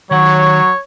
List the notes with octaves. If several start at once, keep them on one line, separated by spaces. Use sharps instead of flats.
D#3 F#3 C#5 F#5